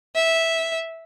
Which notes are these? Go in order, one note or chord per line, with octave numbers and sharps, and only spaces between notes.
E5